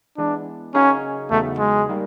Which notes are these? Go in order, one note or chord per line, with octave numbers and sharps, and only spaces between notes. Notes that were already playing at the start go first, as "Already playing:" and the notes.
E3 G#3 B3 D4
C#3 F#3 A#3 C#4 D#4 G#4
E2 C#3 F#3 A3 B3 D#4
G#3
D#3 G3 A#3